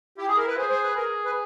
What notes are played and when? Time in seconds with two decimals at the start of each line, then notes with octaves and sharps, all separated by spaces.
0.18 E4 G4
0.28 G#4
0.37 A#4
0.47 B4
0.57 G#4 C5
0.70 C5
0.83 B4
0.96 G#4 A#4
1.25 B4